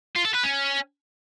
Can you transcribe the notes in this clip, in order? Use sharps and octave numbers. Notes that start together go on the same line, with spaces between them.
F4
A4
B4
C#4